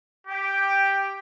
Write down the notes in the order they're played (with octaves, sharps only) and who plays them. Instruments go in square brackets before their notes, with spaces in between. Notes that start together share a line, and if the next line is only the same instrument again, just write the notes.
[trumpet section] G4